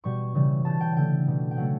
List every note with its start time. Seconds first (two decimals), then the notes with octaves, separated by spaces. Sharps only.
0.04 B2 G3 C#6
0.35 C#3 E3 G3
0.65 C#3 G3 A5
0.81 G5
0.96 D3 A3 G5
1.27 B2 G3
1.51 G5
1.57 C#3 F#3 A3 F#5